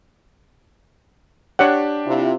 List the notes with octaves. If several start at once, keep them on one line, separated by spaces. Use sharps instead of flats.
D4 G4 C#5 F#5
C3 E4 F4